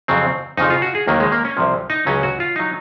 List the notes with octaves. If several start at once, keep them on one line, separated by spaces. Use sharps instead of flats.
F2 C#3 F#3 C4
F2 C#3 F3 D#4
F4
F#4
G#4
D#2 D#3 F#3 A#3
G#3
A#3
C#4
C2 C3 F3
D#4
C#2 C#3 F#3 C#4
F#4
F4
F#3 D#4